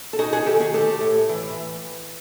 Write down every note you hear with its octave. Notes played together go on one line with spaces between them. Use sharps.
A4
D#4 F#4 G#4
F#4 G#4
D#3 G4 A4
F#4 G#4
A3 G4 A4
A2
E3